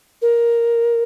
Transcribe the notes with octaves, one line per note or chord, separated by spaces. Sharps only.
A#4